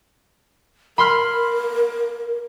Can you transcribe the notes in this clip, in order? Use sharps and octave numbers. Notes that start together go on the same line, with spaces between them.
A#4 B5 C6 F6